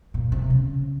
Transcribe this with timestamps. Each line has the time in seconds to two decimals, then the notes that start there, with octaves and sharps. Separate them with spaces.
0.14 A#2
0.32 C3
0.50 C#3